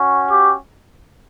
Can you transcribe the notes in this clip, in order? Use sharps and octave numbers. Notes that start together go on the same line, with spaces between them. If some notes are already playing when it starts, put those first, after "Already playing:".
Already playing: C#4 F#4
G4